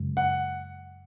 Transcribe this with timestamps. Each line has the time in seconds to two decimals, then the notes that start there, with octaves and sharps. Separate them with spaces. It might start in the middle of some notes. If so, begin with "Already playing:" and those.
Already playing: F#2 C#3 G#3
0.17 F#5